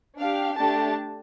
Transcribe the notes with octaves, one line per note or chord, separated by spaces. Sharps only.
D4 G4 F5
A3 D4 G4 A5